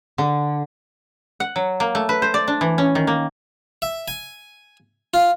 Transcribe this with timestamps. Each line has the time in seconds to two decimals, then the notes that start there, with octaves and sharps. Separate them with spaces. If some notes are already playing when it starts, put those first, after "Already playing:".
0.18 D3
1.40 F#5
1.56 F#3
1.80 A#3
1.95 A3
2.09 B4
2.22 C5
2.34 D5
2.48 D4
2.61 E3
2.78 C#4
2.95 D#3
3.07 A#3
3.82 E5
4.08 G#5
5.14 F4